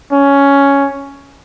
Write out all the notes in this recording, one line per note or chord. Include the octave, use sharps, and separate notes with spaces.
C#4